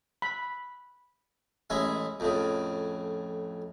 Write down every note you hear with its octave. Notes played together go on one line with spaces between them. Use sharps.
B5
A1 G#3 C#4 E4
F2 A2 C#3